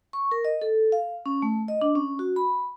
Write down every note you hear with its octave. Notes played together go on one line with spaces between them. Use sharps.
C#6
A#4
D#5
A4
F5
C#4
A3
D#5
D4
C#4
F#4
B5